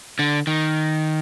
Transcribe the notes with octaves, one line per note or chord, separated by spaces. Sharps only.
D3
D#3